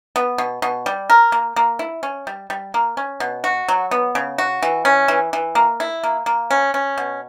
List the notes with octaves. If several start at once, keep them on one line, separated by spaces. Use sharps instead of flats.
B3
B2
B2
G3
A#4
A#3
A#3
E4
C#4
G3
G3
A#3
C#4
B2
F#4
F#3
B3
C#3
F#4
E3
C#4
E3
E3
A#3
E4
A#3
A#3
C#4
C#4
B2